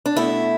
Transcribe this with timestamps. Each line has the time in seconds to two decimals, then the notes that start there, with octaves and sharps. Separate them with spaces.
0.06 D4
0.17 B2 A3 E4